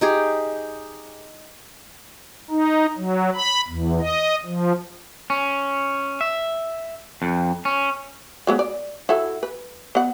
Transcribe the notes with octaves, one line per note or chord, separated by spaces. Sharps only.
D#4 G4 G#4
D#4
F#3
B5
E2
D#5
F3
C#4
E5
F2
C#4
F#3 G#3 B3
D5
E4 F#4 A4
B4
B3 F#5